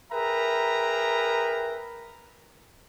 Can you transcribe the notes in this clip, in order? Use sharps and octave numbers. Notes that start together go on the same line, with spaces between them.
G#4 A#4 B4 E5 G5 A#5